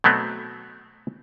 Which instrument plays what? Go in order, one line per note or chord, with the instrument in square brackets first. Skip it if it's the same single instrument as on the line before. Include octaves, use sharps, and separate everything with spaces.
[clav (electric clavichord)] B2 F#3 A3 B3 C4